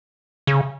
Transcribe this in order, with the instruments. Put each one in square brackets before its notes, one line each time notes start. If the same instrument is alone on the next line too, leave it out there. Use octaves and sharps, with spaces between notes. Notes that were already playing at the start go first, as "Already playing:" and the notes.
[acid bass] C#3